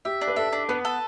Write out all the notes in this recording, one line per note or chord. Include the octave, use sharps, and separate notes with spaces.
G4 E5
D4
B4
A4 E5
D4
B3 B4
A4